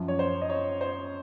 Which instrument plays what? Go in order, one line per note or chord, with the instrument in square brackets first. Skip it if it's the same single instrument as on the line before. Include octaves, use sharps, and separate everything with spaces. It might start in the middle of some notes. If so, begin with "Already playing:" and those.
Already playing: [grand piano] F#2 F3
C#5
C5
D#5
C#5
C5